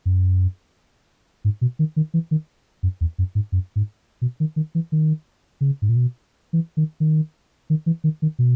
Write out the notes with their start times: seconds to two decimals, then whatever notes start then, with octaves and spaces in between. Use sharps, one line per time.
0.06 F#2
1.45 G#2
1.61 B2
1.79 D#3
1.96 D#3
2.14 E3
2.31 D#3
2.83 F#2
3.01 E2
3.18 F#2
3.35 G#2
3.52 F#2
3.76 G#2
4.22 B2
4.40 D#3
4.56 D#3
4.75 E3
4.92 D#3
5.61 C#3
5.82 G#2
5.89 A#2
5.96 B2
6.53 E3
6.77 D#3
7.00 D#3
7.70 D#3
7.86 E3
8.04 D#3
8.22 D#3
8.39 B2